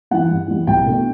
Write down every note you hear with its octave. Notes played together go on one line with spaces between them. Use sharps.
E3 G3 F#5
G2
E3 G3
C2 G5
B2 A3 D4